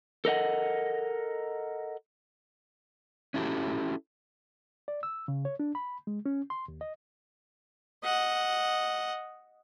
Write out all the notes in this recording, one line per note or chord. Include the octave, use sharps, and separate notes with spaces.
A4 A#4 D#5 F#5
C#4 E4 F#4 G4 A4
D5
E6
C#3
C#5
D4
B5
G#3
C#4
C6
D#2
D#5
D#5 F#5